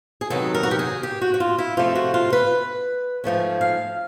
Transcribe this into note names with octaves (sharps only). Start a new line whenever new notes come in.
G#4
C3 D#3 F#3 B3 A4
A#4
F#4
G4
G#4
G4
F#4
F#4
F4
E4
C3 F3 A3 F4
F#4
F4
B4
G#2 F3 A3 C#4
F5